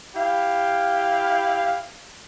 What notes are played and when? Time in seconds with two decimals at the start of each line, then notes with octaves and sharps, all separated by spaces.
0.15 E4 G4 F5